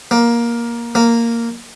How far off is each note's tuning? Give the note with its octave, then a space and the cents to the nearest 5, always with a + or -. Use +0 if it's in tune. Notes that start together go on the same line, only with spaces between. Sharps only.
A#3 +15
A#3 -5